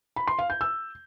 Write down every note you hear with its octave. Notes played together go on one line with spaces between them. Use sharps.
B5
C6
F5
G6
E6